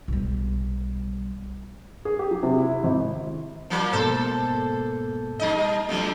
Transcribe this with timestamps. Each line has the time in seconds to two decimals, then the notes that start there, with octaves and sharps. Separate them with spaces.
0.08 B1 G3
2.05 G#4
2.19 G4
2.31 F#3
2.43 C3
2.58 E4
2.84 G#1
3.70 F3 F#3 A#3
3.92 G#2 B2 A#3 A4 C5
5.39 G3 D#4 D#5
5.89 C3 F3 F#3 A3 D4 A4